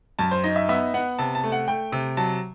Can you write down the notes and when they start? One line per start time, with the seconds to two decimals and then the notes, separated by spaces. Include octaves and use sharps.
0.19 F#2 A5
0.31 C5
0.44 D#4 D#5
0.56 E5
0.69 B3 E5
0.94 B3 F#5
1.19 C3 A5
1.35 A5
1.44 A3
1.52 F#5
1.68 A3 G5
1.92 C3
2.17 F#3 A5